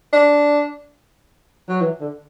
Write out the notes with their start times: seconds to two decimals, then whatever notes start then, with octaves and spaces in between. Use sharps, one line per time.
0.13 D4
1.69 F#3
1.81 E3
2.00 D3